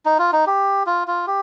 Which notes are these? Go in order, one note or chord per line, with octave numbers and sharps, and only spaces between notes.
D#4
F4
D#4
G4
F4
F4
G4